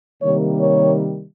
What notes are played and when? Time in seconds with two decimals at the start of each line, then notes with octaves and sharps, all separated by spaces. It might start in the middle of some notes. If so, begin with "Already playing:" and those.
0.22 C3 D#3 G3 A#3 C#5
0.59 C#5